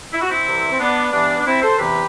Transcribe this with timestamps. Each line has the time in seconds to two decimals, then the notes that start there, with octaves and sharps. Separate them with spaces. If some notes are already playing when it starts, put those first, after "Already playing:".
0.13 E4
0.21 F#4
0.29 C4 E4
0.46 C2 C3 E3
0.71 C4
0.79 B3 D4
1.12 G2 E3 B3 D4
1.39 D4
1.45 C4 E4
1.62 A4 C5
1.78 E2 C3 E3 G4 B4